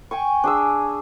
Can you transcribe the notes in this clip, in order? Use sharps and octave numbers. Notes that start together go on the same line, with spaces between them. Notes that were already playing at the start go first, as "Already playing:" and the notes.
G5 G#5 C#6
D4 G#4 E6